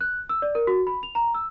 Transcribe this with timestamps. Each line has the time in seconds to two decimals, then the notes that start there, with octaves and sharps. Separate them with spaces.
0.01 F#6
0.29 E6
0.42 D5
0.55 A#4
0.67 F#4
0.87 B5
1.03 F7
1.15 A#5
1.35 E6